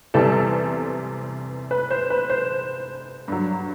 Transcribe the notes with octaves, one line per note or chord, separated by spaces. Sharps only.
E2 C3 E3 G3 A4
B4
C5
B4
C5
G2 F#3